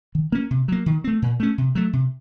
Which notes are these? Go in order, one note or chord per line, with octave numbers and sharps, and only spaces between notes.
D#3
A#3 C#4
C3
F#3 A#3
D#3
A3 C4
A#2
A3 C#4
C3
F#3 A3
C3